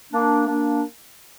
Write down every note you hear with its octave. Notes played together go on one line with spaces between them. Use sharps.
A#3 D4
A#3 D4